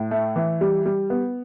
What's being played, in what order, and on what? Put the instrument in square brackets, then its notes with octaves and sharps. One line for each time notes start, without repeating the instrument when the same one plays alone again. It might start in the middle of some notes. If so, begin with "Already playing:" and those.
Already playing: [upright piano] A2
A3
E3
G3
G3
B3